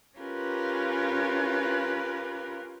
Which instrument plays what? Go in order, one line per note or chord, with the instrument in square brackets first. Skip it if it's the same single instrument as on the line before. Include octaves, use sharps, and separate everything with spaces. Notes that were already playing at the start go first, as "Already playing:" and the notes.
[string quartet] C#4 F4 G4 A#4 B4